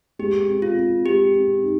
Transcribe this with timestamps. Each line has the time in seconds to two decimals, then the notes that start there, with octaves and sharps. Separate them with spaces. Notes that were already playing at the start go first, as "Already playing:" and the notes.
0.19 G#3 G4
0.48 C4
0.62 F4
0.76 C4
1.06 G#3 G4
1.34 C4
1.63 D#4